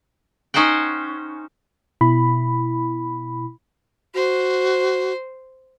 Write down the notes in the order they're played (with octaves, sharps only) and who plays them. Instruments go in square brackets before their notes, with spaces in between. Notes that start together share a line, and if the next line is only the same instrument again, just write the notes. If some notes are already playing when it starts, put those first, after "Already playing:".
[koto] C#4 D#4 C5 F#5 G5
[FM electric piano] B2 E4 B5
[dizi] F#4 [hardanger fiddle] C5